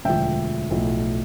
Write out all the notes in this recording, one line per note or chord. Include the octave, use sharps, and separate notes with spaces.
E1 D2 D3 F3 E5 G5
B1 A2 F3